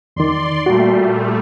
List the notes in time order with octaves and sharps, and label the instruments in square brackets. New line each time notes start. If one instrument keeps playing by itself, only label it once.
[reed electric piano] E2 D#3 [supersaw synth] D5 C6
[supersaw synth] A#2 G3 A3 [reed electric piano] F#4